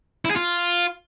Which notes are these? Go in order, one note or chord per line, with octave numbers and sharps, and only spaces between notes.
E4
G#4
F4